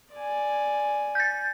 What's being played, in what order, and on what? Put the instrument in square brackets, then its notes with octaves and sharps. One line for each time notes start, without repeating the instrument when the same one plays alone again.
[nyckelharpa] D5 G#5
[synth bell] G6 A6